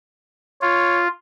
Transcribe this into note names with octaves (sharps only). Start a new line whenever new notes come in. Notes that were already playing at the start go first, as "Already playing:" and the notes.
F4 C#5